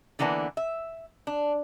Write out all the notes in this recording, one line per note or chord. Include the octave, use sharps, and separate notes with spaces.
D3 E3 A#3 B3 D4
E5
D4